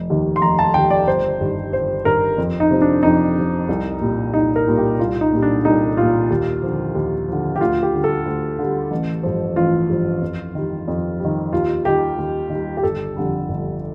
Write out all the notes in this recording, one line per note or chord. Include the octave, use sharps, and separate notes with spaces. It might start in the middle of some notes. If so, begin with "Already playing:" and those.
Already playing: F1
D#2 D#3
C6
F1 A#5
A5
D#2 D#3 G5
D5
G1 C5
G2 D#3
G1 C5
G2 D#3 A#4
F2
D#4
C3 F3
D4
F2 D#4
C3 F3
C2
A#2 G3
C2 D#4
A#4
A#2 G3
G4
C2 F4
D#4
A#2 G3
D4
C2 D#4
A#2 G3 F4
D#2
D3 F3
D#2
D3 F3
G4
D2 F4
G4
D3 G3
A4
D2
D3 G3
A1
G2 F3
A1 F4
G2 F3
F2
D#3 G3
F2
G3
D#3
D#2 F4
D#3 G3 G4
D#2
D#3 G3
G4
G1 A4
F2 D3 G3
G1